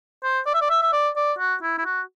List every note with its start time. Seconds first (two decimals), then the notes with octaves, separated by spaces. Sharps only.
0.23 C5
0.46 D5
0.54 E5
0.61 D5
0.70 E5
0.82 E5
0.93 D5
1.16 D5
1.38 F#4
1.62 E4
1.78 E4
1.85 F#4